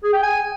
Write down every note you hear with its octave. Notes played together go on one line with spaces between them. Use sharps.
G#4
G5
G#5